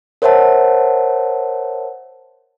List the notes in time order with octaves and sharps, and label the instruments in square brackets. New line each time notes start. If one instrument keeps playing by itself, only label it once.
[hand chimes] A#4 C5 C#5 E5 F#5 A5